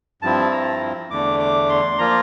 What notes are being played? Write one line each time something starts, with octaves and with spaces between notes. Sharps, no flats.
G2 F3 C4 E4 A5
A#5
E2 D3 A3 D4 D6
D6
C6
F3 A#3 F4 A#5